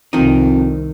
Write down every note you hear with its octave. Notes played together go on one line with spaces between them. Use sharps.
C2 F2 D#3 D#4